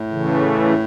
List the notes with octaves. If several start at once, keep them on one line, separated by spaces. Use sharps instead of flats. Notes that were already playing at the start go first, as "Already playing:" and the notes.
Already playing: A2
C#3 E3 A3